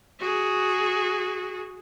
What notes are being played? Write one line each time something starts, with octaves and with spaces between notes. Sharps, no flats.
F#4 G#4